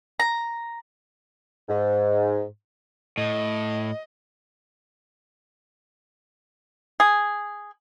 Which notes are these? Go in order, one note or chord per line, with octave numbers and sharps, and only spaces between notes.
A#5
G#2
A2 D#5
G#4